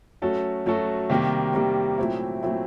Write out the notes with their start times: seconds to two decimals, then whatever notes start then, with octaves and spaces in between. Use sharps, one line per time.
0.22 F#3 A3 C#4 F#4 A4
0.66 F#3 A3 C#4 F#4 A4
1.10 C3 D#3 G3 A#3
1.54 C3 D#3 G3 A#3
1.98 A#2 F#3 A3 C4 E4
2.43 A#2 F#3 A3 C4 E4